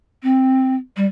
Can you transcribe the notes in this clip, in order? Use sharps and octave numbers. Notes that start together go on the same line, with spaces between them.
C4
G3